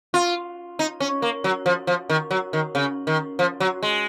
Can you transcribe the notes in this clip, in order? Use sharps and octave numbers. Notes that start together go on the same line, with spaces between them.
F4
D#4
C#4
A#3
F#3
F3
F3
D#3
F#3
D#3
C#3
D#3
F3
F#3
G#3